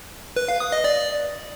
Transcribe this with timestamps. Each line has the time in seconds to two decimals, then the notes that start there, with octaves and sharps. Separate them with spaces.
0.36 B4
0.48 F5
0.60 D#6
0.72 D#5
0.84 D5